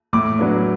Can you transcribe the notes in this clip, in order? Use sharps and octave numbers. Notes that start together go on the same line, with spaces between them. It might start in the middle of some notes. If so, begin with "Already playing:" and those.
A2 D6
F#3 B3 D4